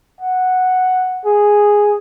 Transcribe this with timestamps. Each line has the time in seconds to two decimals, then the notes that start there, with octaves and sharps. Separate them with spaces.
0.21 F#5
1.25 G#4